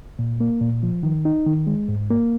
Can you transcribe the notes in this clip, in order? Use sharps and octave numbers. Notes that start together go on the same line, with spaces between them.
A#2
A#3
A#2
F3
D#3
D#4
D#3
G#3
G#2
A#3